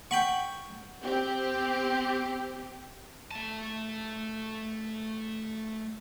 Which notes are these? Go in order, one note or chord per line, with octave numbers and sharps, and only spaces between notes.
F#5 G5 B5 C#6
C4 G4
A3 A5